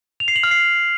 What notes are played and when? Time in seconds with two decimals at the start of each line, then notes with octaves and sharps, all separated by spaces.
0.20 F7
0.28 C7
0.36 F#7
0.43 F6
0.51 C7